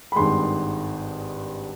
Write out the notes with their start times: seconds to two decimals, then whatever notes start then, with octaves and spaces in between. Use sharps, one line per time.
0.12 B5
0.15 G#1 G2 D#3 G#3 C6